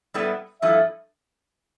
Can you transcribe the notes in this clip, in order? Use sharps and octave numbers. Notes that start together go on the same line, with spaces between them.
A2 G3 B3 E4 A4
G2 F3 A3 E4 A4 E5